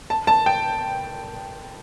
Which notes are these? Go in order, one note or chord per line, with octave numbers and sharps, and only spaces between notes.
A5
A5
G5